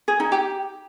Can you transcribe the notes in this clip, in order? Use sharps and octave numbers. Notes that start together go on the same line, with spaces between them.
G#4
D#4
G4